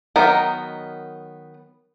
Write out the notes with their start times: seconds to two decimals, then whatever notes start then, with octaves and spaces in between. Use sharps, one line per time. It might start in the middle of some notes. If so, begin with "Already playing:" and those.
0.16 D#3 F#3 B3 D#4 A#4